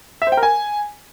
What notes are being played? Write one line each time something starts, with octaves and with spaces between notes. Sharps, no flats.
E5
C5
G5
A#4
G#5